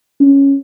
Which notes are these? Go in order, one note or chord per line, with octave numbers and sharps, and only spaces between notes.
C#4